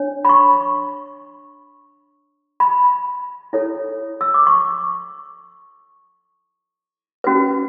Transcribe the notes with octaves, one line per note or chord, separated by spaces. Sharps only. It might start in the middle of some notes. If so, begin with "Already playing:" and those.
Already playing: D4 C#5
B5
C#6
B5
E4 A4 C#5
E6
D6
C#6
C#4 F#4 B4